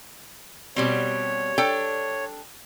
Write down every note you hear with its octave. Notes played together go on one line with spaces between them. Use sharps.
B2 G3 C4 C#5
D4 A4 G5